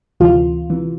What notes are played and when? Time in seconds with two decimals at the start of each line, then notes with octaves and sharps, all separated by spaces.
0.20 D2 C3 E3 F4
0.70 C3 E3